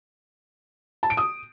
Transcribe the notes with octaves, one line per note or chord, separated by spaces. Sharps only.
A5
D7
D#6